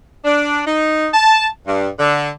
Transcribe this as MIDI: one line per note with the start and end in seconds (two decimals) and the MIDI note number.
0.25 0.61 62
0.66 1.07 63
1.13 1.45 81
1.66 1.88 43
1.99 2.29 50